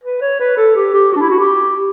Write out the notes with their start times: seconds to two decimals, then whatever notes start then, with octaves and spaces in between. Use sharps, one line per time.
0.04 B4
0.21 C#5
0.40 B4
0.57 A4
0.76 G4
0.94 G4
1.13 F#4
1.16 D4
1.21 E4
1.30 F#4
1.39 G4